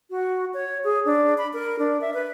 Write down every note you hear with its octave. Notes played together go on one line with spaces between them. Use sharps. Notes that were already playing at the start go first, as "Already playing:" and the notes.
F#4
C#5
G#4
D4
B5
A#4
D4
E5
B4